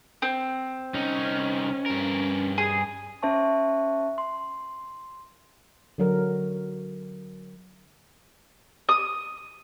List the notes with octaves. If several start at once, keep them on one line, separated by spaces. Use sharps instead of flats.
C4
C2 C#4 D#4
G2 A#4
G#4
C#4 C5 E5 A5 C#6
C6
D3 F#3 A#4
D#6